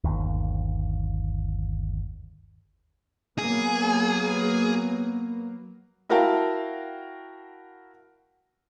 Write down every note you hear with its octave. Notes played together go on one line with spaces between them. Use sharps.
G1 D#2
F#3 A#3 B3 G#4
E4 F#4 A#4 F5 G5 A5